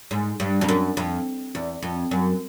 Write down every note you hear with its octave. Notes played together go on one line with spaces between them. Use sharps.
G#2
G2
F2
F#2
F2
E2
F2
F#2